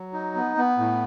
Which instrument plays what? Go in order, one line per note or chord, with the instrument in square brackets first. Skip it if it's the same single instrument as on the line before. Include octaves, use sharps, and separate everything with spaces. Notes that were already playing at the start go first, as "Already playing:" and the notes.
Already playing: [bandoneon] F#3
D#4
B3
B3
A2